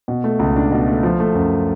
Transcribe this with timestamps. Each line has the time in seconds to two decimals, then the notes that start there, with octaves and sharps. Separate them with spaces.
0.08 B2
0.24 A3
0.39 C#2
0.56 D4
0.72 B2
0.88 A3
1.03 F3
1.20 A3
1.35 F#2